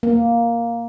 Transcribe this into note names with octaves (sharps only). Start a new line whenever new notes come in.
A#3